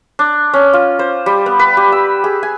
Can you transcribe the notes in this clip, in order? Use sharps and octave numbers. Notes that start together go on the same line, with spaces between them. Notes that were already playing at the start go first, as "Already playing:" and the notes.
D4
C#4
F4
C5
G3
B3
B4
G4
E6
G#4
G#5